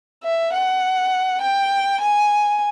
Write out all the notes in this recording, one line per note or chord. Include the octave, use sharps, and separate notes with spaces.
E5
F#5
G5
G#5